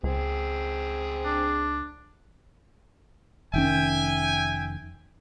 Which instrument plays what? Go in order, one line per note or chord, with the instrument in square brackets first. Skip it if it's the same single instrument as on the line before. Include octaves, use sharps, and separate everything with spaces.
[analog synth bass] C#2 [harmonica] C4 G#4
[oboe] D4
[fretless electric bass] F1 D#3 C#4 [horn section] E5 G5 G#5